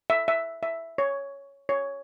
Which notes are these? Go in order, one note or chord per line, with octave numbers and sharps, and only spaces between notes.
E5
E5
E5
C#5
C#5